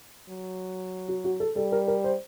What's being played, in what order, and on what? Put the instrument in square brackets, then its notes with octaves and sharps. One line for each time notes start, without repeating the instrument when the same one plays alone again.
[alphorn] F#3
[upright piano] F#4
F#4
A4
[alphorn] G3 [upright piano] A4
[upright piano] A#4
A#4
C5